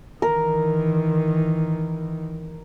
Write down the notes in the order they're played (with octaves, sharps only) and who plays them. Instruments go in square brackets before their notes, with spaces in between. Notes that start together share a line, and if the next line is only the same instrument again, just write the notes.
[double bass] D#3 E3 [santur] A#4